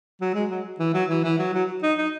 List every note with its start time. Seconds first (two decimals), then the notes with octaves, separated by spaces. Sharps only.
0.21 F#3
0.34 G#3
0.50 F#3
0.79 E3
0.94 F#3
1.10 E3
1.24 E3
1.39 F#3
1.54 F#3
1.83 D#4
1.98 D#4